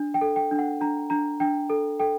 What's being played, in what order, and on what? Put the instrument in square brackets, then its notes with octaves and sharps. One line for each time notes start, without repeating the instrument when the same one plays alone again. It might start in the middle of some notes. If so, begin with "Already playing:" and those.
Already playing: [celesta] D4
G5
A4
G5
D4
F#5
D4 A#5
D4 A#5
D4 G5
A4
A4 G5